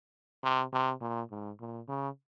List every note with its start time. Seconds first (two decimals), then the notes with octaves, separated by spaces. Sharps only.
0.44 C3
0.73 C3
1.01 A#2
1.31 G#2
1.60 A#2
1.88 C#3